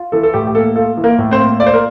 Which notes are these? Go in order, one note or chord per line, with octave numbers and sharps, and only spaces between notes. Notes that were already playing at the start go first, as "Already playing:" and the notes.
Already playing: F4
E3 A4
A4
A2 G4
G4
A#3 A4
F4 A4
E3
A#3 A#4
A2
C4 C5
A#3
F4 D5
C5
A#4